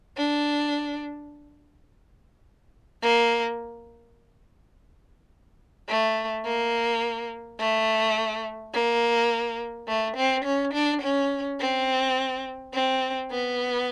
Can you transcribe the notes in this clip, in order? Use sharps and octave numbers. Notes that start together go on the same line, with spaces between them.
D4
A#3
A3
A#3
A3
A#3
A3
C4
C#4
D4
C#4
C4
C4
B3